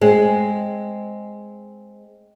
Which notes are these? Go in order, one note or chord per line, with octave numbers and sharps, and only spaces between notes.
G#3 C4